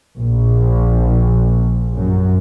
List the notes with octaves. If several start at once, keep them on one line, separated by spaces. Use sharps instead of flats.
A#1
F#2